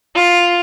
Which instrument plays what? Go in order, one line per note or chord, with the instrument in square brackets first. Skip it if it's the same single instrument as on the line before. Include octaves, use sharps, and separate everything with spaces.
[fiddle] F4